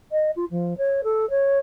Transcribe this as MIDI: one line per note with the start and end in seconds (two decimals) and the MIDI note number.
0.12 0.30 75
0.36 0.45 65
0.50 0.76 53
0.77 1.01 73
1.03 1.28 69
1.30 1.59 73